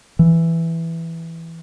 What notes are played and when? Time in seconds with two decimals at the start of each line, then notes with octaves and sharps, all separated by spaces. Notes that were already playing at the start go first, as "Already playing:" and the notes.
0.19 E3